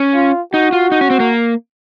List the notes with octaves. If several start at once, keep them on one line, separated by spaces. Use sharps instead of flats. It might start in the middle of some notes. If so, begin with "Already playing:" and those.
Already playing: C#4
F4
D#4 F#4
F4
D#4
C#4
C4
A#3